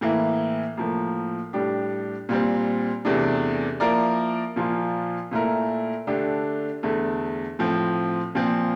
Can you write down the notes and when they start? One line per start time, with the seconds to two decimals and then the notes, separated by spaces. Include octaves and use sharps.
0.01 A2 E3 A#3 E4
0.77 A2 F3 A#3
1.53 A2 G3 D4 G4
2.29 A#2 G3 C4
3.05 E2 C3 E3 A3 D4
3.80 F3 A#3 E4 A#4 D5
4.56 A#2 F3 A#3 F4
5.31 A#2 A3 E4 A#4
6.07 D3 A3 D4 G4
6.83 E2 D3 A3
7.59 A2 F3 C4
8.35 A#2 F3 C4